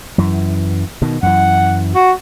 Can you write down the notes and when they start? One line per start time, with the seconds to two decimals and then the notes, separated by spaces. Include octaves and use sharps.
0.18 F#2 E3
1.02 B2 D#3
1.23 F#2 E3 F#5
1.95 F#4